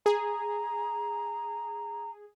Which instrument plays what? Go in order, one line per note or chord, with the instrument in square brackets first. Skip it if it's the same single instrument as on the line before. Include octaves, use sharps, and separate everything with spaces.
[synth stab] G#4 [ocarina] A#5